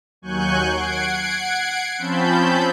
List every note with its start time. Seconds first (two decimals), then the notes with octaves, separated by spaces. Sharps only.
0.22 D#2 F#3 G#5 C#6 F#6 G6
0.69 F#5 G#6 C7 D7
1.99 F3 C4 C#4 A5 B5 G6